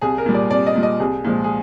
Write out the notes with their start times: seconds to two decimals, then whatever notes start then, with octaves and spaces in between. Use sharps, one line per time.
0.01 C2 G#4
0.18 A#4
0.26 A#2 G3
0.34 D5
0.51 C2 D5
0.66 D#5
0.75 A#2 G3
0.83 D#5
1.00 C2 G#4
1.24 A#2 F3 G#3
1.44 G#4